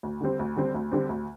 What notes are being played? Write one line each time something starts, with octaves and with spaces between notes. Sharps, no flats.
D2
D3 G3 C4
D2
D3 G3 C4
D2
D3 G3 C4
D2